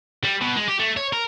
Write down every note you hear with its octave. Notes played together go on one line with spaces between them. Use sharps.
G3
B2
G#3
G4
A3
C#5
A#4